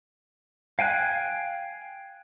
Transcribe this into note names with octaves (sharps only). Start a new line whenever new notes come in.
F5 G5 G#5 F#6